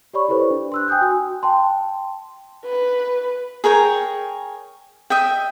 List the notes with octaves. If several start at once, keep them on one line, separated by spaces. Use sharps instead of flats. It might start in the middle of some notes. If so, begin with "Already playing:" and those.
G4 C#5 D5 B5 C#6
E4 G4 A4 B4 C5 D5
D4
C6 E6 F#6
G5 G#5 D#6 F#6 G6
F#4 G#5
G5 A5 C6
B4
G#4 A#4 C#5 G5
D#5 E5 G5